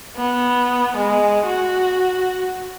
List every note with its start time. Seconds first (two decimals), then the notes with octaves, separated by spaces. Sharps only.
0.17 B3
0.96 G#3
1.46 F#4